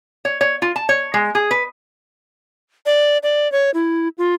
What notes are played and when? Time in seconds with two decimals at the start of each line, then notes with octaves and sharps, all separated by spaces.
0.25 C#5
0.41 C#5
0.62 F4
0.76 A5
0.89 C#5
1.14 G#3
1.35 G#4
1.51 B4
2.86 D5
3.23 D5
3.52 C#5
3.74 E4
4.18 F4